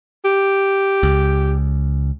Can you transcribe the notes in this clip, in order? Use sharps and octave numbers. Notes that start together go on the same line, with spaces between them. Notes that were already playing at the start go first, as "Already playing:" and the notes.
G4
C#2